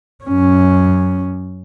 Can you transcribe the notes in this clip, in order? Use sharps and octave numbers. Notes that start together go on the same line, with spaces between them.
F#2 C#4